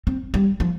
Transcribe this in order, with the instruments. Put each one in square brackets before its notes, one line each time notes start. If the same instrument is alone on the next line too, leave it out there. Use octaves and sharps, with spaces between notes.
[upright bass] C4
G3
F3